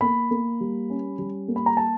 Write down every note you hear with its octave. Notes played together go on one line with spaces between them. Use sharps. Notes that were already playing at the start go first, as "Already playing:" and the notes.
A#3 B5
A#3
G3
C#4
G3
A#3
B5
A#5
A5